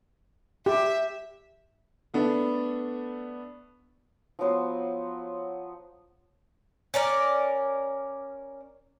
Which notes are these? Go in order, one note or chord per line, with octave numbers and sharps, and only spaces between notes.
G4 E5
A3 B3 D4 A4
F3 F#3 B3 C5
C#4 A#4 D5